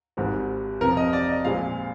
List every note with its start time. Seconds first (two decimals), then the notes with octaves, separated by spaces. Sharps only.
0.17 G#1 G#2 G3 C4
0.81 F2 C3 F3 C4 A#4
0.97 D#5
1.13 D5
1.29 D#5
1.45 A#1 A#2 G#3 C4 F5